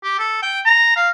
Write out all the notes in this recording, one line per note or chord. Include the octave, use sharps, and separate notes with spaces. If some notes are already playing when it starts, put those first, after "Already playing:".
G4
A4
G5
A#5
F5